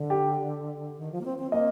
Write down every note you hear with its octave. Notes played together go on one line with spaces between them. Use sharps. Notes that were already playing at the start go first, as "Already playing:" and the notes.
Already playing: D3
G4
D#3
F3
A#3
C4
C4
A#3 D#5